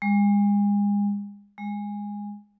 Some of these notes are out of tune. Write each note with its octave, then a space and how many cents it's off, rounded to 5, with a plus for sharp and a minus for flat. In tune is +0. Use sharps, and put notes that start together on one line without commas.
G#3 -35
G#3 -15